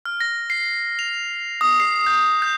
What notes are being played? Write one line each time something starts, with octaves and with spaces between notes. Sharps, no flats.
F6
A#6
C7
F7
D#6
C7
G6
G6